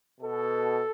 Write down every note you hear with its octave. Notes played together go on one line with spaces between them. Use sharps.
B2 A4